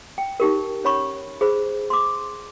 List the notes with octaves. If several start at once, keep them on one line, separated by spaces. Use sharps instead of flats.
G5
D#4 G4 A#4
C#4 C#5 B5 C#6
G#4 C5 B5
C6 D6